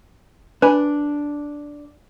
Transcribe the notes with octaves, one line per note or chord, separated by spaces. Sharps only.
D4 B4 G#5 B5